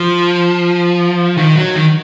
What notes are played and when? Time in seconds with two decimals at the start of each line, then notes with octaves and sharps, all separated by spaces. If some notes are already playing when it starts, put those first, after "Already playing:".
Already playing: F3
1.37 D#3
1.56 F#3
1.75 D#3